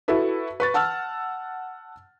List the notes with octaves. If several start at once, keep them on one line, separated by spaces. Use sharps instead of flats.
E4 F#4 A4 B4 E5
B4 C#6 A6
F#5 A5 E6 F6